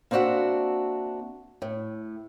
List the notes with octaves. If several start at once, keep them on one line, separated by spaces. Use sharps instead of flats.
A#3 C4 D4 F#4 E5 F#5
A2